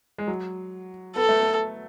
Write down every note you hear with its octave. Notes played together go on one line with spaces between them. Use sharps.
G#3
F#3
B3 A4
A3
B3